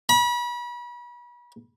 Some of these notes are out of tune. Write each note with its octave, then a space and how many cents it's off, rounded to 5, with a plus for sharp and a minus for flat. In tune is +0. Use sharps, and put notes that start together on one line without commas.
B5 -35